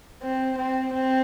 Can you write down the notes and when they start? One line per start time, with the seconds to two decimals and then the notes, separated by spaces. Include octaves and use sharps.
0.22 C4
0.58 C4
0.93 C4